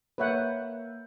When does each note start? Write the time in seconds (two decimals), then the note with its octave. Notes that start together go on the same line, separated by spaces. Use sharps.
0.18 A#3 B4 C#5 E5 F#5 G6